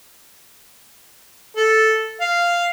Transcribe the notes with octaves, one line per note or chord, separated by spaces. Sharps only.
A4
F5